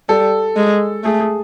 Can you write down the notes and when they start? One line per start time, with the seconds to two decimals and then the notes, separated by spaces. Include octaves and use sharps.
0.09 G3 A4
0.56 G#3
1.04 A3 G#4
1.20 G#4